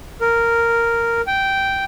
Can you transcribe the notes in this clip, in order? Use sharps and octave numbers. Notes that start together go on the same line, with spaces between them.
A#4
G5